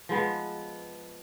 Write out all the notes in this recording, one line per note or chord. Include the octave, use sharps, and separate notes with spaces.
F3 G#3 B3